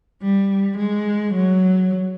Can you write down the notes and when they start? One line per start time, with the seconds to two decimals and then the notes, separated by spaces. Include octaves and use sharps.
0.22 G3
0.78 G#3
1.34 F#3